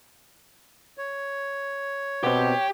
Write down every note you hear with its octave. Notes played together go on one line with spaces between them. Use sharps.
C#5
B2 B3 C4 G4